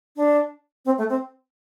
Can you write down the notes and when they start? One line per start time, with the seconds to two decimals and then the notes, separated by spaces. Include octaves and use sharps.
0.16 D4
0.85 C4
0.98 A3
1.09 C4